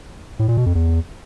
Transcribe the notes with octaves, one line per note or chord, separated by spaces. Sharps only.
A2
A#2
B2
F2
E2